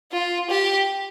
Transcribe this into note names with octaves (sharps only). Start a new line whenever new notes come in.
F4
G4